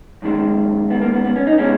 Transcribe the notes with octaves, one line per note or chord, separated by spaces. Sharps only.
F#2 D#3 G#3
B3
A#3
B3
B3
C#4
D#4
B2 G#3 C#4